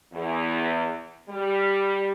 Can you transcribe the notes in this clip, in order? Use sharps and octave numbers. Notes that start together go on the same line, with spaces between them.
E2
G3